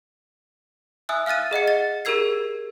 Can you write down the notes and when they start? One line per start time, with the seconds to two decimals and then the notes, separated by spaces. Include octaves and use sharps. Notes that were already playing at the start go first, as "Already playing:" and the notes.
1.09 E5 G#5 D#6 E6 F#6
1.26 F5 F6 F#6 A6 D#7
1.51 G#4 D#5 F#5 C#7
1.68 A6
2.05 G4 G#4 A#4 E6 G#6 C7